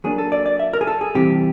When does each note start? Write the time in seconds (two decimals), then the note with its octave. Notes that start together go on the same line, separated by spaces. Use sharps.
0.04 F#3 A#3 D4 G#4
0.18 A4
0.32 D5
0.46 D5
0.59 E5
0.73 A#4
0.81 G#4
0.87 A4
1.01 G#4
1.15 C3 E3 G3 C4 G4